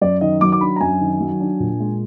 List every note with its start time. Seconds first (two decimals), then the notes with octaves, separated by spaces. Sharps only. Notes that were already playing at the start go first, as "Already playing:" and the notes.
0.02 F#2 D5
0.21 D#3 D#5
0.41 F#3 D6
0.52 D6
0.61 D4 B5
0.76 A#5
0.81 F#2 G#5
1.00 D#3
1.20 F#3
1.40 D4
1.60 A#2
1.80 G#3